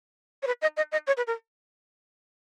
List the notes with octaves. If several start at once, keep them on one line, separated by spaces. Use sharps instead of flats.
C#5
B4
D#5
D#5
D#5
C#5
B4
A#4